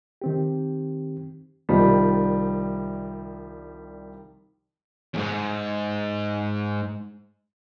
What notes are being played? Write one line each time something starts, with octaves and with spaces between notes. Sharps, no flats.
D#3 C4 G4
C2 D#3 F3 G3
E2 G#2